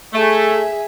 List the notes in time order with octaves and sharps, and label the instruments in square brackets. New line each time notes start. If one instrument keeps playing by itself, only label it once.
[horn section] A3 [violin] G#4 E5